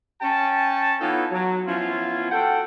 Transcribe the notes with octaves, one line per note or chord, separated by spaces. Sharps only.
C#4 G5 A5
E3 B3 D#4 F4 A4 C#5
F#3
F3 B3 C#4 E4 F4
F#4 A4 F#5 G5